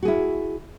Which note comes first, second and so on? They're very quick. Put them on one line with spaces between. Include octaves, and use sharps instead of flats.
F#4 G#4 E4